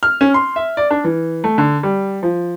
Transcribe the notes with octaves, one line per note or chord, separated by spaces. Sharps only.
F6
C#4
C6
E5
D5
D4
E3
A3
D3
G3
F3